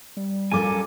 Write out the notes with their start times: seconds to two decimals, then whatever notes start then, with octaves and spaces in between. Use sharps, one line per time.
0.17 G3
0.51 A#1 F#2 F4 A4 A#4 G#5 D6